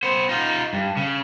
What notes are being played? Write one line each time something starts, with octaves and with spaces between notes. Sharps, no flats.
B3 C5
D#4 F4
G2
C#3